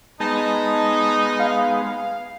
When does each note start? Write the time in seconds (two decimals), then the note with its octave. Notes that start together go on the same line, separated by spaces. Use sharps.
0.20 G#3 B3 D#4 A5
1.39 F5